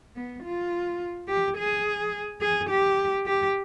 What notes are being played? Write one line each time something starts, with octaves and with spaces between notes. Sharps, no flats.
B3
F4
G4
G#4
G#4
G4
G4